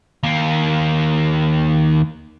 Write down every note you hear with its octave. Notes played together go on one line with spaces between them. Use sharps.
D#2 A#3